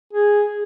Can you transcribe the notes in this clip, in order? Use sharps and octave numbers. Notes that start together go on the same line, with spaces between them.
G#4